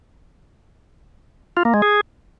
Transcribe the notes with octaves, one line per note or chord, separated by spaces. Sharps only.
F4
A#3
G#3
G#4